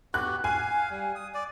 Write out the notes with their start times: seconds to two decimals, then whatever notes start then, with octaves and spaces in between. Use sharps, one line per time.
0.14 B3 F#4 G4 F#6
0.44 F5 G#5
0.90 G3
1.15 D#6
1.34 D5